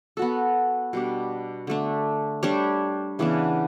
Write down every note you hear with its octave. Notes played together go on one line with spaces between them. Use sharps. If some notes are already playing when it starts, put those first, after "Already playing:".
B3 F#4 A4
B2 G3 D4
D3 A3 D4
G3 D4 G4 C#5
C#3 E3 B3 D4